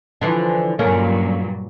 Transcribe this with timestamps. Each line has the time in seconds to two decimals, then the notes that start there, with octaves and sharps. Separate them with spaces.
0.21 D3 E3 F3
0.79 G2 A#2 D3 F#3 A#3 C#4